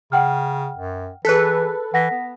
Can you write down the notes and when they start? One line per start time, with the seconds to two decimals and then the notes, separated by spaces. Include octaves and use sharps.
0.12 C#3 F#5 G5 F6
0.77 F#2
1.25 E3 G#4 A4 B4 F#6 B6
1.94 E3 F#5 A#6 B6
2.11 B3